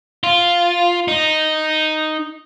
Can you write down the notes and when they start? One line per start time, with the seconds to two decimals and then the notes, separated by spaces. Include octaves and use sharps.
0.24 F4
1.08 D#4